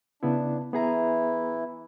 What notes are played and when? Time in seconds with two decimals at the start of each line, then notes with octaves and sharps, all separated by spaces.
0.23 C#3 B3 D4 E4
0.73 E3 B3 E4 G#4 A#5